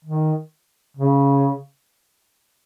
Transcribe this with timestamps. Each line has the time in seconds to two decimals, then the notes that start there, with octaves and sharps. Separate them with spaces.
0.05 D#3
0.97 C#3